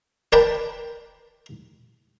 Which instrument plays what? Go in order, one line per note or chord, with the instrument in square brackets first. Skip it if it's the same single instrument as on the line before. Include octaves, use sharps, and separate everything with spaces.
[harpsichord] A#4 B4 D5 G5 A5